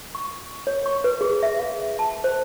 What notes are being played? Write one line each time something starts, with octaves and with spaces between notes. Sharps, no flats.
C#6
C#5
C#6
B4
G#4
E5
F5
A5
C5